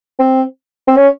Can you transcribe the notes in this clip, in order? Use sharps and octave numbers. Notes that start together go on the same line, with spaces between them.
C4
C4
C#4